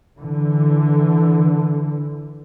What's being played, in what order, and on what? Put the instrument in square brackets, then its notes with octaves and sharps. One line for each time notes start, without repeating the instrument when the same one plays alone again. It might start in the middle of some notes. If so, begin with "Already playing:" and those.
[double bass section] D3 E3